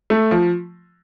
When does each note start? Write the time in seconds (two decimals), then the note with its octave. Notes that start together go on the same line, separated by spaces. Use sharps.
0.10 A3
0.31 F3